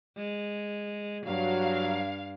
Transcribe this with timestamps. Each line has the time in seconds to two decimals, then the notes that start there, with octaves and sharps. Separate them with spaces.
0.17 G#3
1.26 G2 F#3 F5